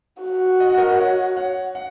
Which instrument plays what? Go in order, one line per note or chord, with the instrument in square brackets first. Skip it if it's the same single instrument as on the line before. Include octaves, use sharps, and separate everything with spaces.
[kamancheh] F#4
[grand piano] D#5
F#5
A#4 D#5
C#5 F#5
C#5 F#5
F#5